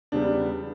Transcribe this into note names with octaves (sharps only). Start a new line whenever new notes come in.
E2 C#3 G3 B3 D4